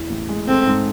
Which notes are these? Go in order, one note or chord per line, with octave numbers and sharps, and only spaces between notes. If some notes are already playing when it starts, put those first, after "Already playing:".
Already playing: E2 E3
A1
G#3
A3 C4
G#2